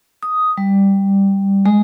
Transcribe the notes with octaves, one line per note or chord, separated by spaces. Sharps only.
D#6
G3
G#3